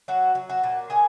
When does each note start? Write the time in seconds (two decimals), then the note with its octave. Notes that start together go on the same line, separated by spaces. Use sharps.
0.08 F#3 F#4 F#5
0.35 F#3
0.49 F#4 F#5
0.63 A#2
0.90 A#2 G#4 G#5